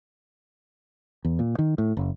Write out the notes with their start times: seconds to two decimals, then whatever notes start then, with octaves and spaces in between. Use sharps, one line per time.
1.25 E2
1.39 A#2
1.59 D#3
1.78 A2
1.97 F#1